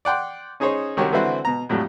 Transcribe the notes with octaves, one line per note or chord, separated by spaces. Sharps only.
D5 F#5 G5 C6
C#4 D#4 G#4 C5 C#5
C2 D#3 F#4 G4 C#5
D3 E3 C4 E4 F#4 C5
B2 A#5
F2 A2 F#3 G3